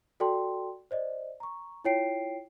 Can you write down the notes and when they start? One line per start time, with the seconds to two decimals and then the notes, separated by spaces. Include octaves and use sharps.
0.20 F#4 A4 D5 G5 A5 C6
0.91 C5 D5 D#5
1.40 A#5 C#6
1.85 E4 F4 C#5 G5 C7 D7